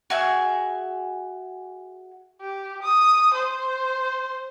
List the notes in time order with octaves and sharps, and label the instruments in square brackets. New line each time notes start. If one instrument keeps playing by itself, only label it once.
[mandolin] F#4 G#4 E5
[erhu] G4
D#6
C5